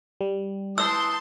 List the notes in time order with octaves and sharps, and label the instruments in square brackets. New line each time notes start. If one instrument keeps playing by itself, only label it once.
[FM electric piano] G3
[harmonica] E3 D#6 [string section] A5 C6 G6 [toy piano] E6